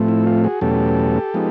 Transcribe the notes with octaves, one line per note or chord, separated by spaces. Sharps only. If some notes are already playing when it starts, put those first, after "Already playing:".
Already playing: A2 F3 A3 C4
E4
F4
F#4 G#4
E2 B2 F#3 A3 C#4 G4 A4
F3 G#3 B3 D#4